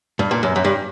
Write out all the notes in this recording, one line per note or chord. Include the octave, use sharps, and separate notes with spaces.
G2
A#2
F#2
F#2
G2